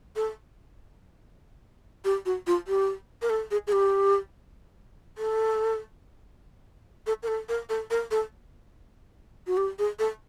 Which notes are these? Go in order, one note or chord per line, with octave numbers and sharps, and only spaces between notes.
A4
G4
F#4
F4
G4
A#4
A4
G#4
G#4
G4
A4
A4
A#4
A4
A#4
A4
A#4
A4
F#4
G4
G#4
A4